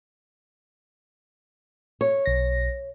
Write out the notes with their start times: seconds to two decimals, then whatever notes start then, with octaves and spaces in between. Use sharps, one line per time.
2.01 C#5
2.26 B1 A#6